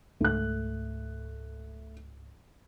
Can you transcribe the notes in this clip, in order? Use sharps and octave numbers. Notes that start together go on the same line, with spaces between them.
C#2 G#2 A3 F#6